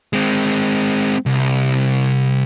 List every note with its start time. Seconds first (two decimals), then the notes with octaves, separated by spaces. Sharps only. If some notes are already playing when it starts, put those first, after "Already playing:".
0.13 G#3 C4
1.26 C2